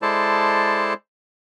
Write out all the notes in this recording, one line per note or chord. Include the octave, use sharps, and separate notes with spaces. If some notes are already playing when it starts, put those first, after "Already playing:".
G#3 E4 A4 C5 D5 A5